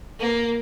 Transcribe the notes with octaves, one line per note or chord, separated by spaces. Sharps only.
A#3